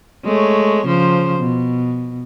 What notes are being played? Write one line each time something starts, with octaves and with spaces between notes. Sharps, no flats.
G#3 A3 C#5
C#3 F3 C5
B2